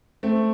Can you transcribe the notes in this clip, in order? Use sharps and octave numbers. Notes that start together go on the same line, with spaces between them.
A3 C4